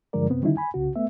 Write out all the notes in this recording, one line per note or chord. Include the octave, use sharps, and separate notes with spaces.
G2 D3 F3 G#3 A#4 D5
F#2 C3 B3 C4
D3 D#3 G3 C#4 D#4 E4
G#5 B5
C2 C#3 F#4
A3 B3 E5